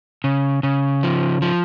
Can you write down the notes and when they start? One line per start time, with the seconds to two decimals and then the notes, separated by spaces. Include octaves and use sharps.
0.24 C#3
0.63 C#3
1.03 F3
1.42 F3